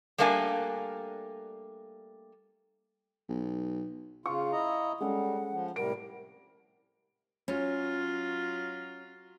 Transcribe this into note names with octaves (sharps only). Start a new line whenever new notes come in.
G3 A3 A#3 D4 E5 G#5
B1
C#3 F4 F5 C#6
E4 D#5 A#5
G3 G#3 C#4 A4 F#5
F3
A2 C3 G3 A#4 D7
F#3 C#4 F4